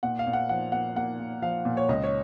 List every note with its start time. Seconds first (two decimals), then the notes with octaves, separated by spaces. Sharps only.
0.03 A#2 F#5
0.19 F5
0.27 A#2
0.33 F#5
0.49 F3 F#5
0.72 A#3 F#5
0.96 A#3 F#5
1.19 A#3
1.42 F3 F5
1.65 A#2
1.77 C#5
1.89 C#2 D#5
2.04 C#5